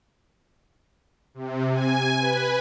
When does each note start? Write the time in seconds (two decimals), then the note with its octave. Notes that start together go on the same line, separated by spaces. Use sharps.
1.34 C3
1.71 G#5
2.18 B4